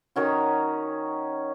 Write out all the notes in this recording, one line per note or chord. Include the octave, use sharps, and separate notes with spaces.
D#3 C#4 F#4